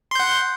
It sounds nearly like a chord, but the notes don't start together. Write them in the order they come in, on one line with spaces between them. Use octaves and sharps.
C6 G6 F#5